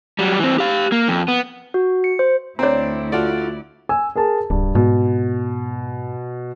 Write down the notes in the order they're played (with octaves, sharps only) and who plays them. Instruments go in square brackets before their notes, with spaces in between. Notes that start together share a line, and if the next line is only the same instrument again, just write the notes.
[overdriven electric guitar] F#3 G3
E3 C4
G4 F5
A#3
F2
B3
[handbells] F#4
C#7
C5
[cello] D2 E4 [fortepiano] C4 D4 [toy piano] C#5 A#5
[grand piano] F4 F#4 A4 [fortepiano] D5
[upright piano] G#5 E6
G#4 A#4 A5
[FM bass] D1 [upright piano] G2
[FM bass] G#2 [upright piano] B2